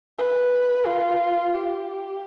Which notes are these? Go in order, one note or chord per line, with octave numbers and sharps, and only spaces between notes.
B4
F4
G4